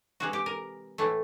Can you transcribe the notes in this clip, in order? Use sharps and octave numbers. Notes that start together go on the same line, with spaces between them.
C3 E3 G#3 F#4
G4
A#4
A2 E3 A3